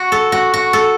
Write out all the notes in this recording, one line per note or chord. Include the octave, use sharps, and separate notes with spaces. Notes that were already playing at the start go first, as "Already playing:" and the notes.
Already playing: F#4
A4
F#4
F#4
A4